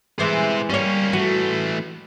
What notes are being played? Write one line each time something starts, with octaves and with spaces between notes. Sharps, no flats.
E3 G#3 B3 C5 E5
G3 A#3 C#4 C#5
E3 A3 F#4